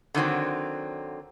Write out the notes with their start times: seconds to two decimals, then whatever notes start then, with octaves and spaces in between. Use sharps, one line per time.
0.14 D3 D#3 F#3 C4